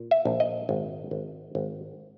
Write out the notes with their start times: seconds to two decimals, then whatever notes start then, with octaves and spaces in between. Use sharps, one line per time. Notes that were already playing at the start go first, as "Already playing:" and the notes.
Already playing: A#2
0.11 E5
0.25 A#1
0.40 D#5
0.69 G#1
1.11 G#1
1.55 G#1